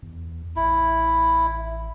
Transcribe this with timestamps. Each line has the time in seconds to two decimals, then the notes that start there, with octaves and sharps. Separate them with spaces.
0.03 E2
0.56 A1 E4